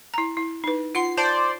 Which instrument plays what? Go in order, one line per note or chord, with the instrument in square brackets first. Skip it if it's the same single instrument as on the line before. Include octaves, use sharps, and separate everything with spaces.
[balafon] E4 A#5
E4
D#4 B4
[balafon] F4 F#5 C6 [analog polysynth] C7
[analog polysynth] C5 D5 [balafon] A5